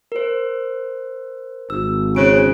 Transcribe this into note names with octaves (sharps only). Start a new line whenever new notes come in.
A#4 C5
G#1 E6
C#3 C5 F#6 D7